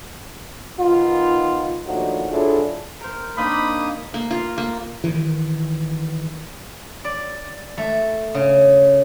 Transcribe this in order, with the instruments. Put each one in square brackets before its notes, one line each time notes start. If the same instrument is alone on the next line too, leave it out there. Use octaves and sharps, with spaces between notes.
[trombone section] D#3 B3 D#4 F4
D#2 A2 F3 D4 D#4 F#4
F#3 D4 E4 F4 G#4 A4
[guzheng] A#4 C5
[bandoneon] A#3 D#6 [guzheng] C4 D4 D#4 [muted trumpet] B5
[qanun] A#3
F4
A#3
[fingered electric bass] D#3 E3
[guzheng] D5
A3
C#3